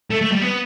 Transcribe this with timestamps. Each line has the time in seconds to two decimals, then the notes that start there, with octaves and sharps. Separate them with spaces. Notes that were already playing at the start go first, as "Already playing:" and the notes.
0.11 A3
0.21 A3
0.32 G3
0.42 B3